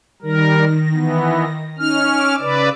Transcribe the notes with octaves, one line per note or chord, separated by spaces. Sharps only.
D#3 G3 A#4 A#6
E3 B3
C#4 D#4 F6
D6 E6
C#3 B4 D5